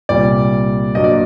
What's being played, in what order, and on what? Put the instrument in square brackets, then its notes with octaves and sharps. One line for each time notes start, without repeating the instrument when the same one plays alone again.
[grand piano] C2 A#2 G3 D5
G2 F#3 A#3 D4 D#5
D5